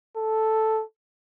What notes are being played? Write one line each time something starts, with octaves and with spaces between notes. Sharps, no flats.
A4